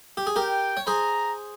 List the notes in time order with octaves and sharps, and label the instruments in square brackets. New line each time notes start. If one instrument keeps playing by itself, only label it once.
[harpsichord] G4
G#4
[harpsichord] G4 A#4 [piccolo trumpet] G5
[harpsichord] C#5
[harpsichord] G#4 C5 [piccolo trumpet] A#5